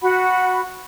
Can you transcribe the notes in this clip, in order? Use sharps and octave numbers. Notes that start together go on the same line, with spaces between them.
F#4 F#5 B5